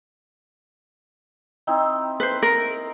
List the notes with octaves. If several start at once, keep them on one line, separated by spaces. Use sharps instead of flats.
C4 D#4 E4
B4 C5
A#4